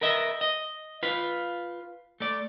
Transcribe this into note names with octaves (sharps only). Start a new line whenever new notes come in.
A#4 B4 D#5 E5
D#5
F4 B4
A3 D5